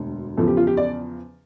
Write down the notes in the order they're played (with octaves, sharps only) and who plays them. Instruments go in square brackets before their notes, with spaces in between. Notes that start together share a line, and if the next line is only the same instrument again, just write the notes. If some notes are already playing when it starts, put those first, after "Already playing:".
Already playing: [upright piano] E1 D2 D3
E2 C#3 F3 A4
G4
F4
G4
D5